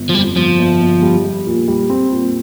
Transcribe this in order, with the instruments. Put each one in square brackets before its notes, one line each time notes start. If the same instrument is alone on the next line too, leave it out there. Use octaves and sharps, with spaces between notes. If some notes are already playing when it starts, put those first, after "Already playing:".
Already playing: [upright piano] G1
[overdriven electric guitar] F3
[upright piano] F2 [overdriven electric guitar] G3
[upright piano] G1 [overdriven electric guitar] F3
[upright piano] G1
G1
G3
G3
A#2
G3
C4
A#2